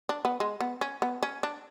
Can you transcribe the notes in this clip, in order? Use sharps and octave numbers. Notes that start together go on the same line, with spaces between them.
D4
B3
G#3
B3
C#4
B3
C#4
D4